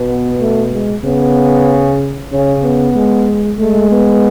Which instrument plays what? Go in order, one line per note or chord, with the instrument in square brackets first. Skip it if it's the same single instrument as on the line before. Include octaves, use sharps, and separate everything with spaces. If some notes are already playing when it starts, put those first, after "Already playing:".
Already playing: [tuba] B2
[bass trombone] B3
A3
G#3
[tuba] C#3 [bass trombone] B3
[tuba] C#3 [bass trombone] C#4
[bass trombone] B3
[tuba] G#3
[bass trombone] G#3 [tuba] A3
[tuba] B3